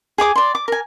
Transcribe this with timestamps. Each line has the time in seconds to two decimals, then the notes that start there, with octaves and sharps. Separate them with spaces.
0.18 G#4 G#5 D6 D#6
0.36 D5 C6
0.55 D6
0.68 A#4 G#5